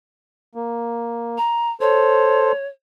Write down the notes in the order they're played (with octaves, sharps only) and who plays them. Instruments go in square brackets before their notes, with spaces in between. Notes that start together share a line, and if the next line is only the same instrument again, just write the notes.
[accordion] A#3
[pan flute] A#5
[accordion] A4 C5 [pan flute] C#5